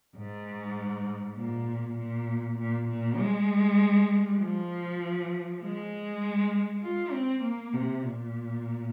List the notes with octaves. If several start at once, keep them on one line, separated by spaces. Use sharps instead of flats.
G#2
A#2
A#2
A#2
A#2
G#3
F3
G#3
F4
C4
A#3
C3
A#2